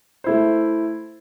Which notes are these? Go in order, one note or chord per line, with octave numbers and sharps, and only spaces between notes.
A3 E4 C5